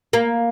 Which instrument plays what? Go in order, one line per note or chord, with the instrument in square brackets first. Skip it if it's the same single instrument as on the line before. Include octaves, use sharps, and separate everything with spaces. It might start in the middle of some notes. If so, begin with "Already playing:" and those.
[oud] A#3